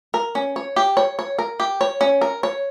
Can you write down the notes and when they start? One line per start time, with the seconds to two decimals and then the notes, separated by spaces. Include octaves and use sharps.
0.14 A#4
0.35 C#4
0.56 C#5
0.76 G4
0.97 C#5
1.19 C#5
1.39 A#4
1.60 G4
1.81 C#5
2.01 C#4
2.21 A#4
2.43 C#5